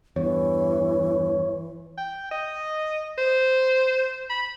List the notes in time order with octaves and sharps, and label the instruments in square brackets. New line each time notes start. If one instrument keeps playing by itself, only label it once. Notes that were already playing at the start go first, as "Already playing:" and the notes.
[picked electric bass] E2 G2 [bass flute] E3 [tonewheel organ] C#5
[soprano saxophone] G5
D#5
C5
B5